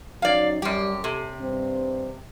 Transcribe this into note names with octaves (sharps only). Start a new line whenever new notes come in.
F#3 C#4 D#4 D5 F5
F#2 G3 G4
C3 G4 A4
G2 C4